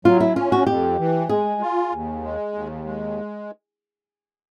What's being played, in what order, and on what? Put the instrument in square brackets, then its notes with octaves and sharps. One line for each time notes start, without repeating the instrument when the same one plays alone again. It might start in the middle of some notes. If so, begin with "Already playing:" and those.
[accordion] F#3 [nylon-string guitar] F4
[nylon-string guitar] E4
[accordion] C#4 [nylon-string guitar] F4
[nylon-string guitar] F#4
[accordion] F2 [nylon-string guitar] G4
[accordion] E3
[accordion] G#3 [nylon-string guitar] G#4
[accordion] F4
D#2
G#3
D#2
G#3